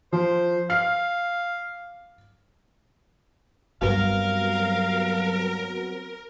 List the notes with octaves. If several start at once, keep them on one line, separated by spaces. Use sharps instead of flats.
F3 C5
F5 F6 C7
G2 F#3 G3 B3 C4 A#4 F5